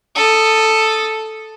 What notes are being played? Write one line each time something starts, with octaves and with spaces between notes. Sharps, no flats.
A4 D#6